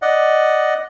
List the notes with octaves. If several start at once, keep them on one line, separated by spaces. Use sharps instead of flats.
D5 D#5 F#5